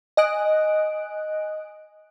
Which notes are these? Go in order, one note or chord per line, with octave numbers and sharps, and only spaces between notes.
D#5 G#5 D#6 F#6 D7